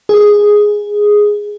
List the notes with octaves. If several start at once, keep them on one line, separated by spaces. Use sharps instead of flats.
G#4